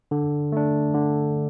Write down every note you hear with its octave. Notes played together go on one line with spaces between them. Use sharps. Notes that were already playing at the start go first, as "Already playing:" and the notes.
D3
A3 D4
D3